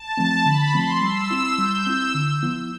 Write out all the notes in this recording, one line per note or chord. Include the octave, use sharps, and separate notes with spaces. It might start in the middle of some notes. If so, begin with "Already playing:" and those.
Already playing: A5
F3 A3 C4
D3 B5
F3 A3 C4 C6
G3 E6
C4 E4
G3 G6
C4 E4 E6
D3
F3 B3 E4